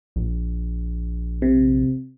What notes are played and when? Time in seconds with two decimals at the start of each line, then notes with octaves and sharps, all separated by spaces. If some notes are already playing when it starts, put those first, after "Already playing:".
0.16 A#1
1.42 C3